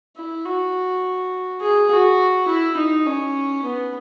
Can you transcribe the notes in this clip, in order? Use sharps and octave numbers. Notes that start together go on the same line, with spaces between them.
E4
F#4
G#4
F#4
E4
D#4
C#4
B3